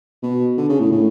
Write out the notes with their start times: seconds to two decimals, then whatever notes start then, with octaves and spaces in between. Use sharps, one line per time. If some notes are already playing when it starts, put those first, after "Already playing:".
0.22 B2
0.57 D3
0.69 C#3
0.80 A2
0.92 A2